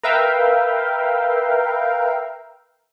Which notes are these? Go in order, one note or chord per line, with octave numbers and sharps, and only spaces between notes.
A#4 B4 E5 F5 G5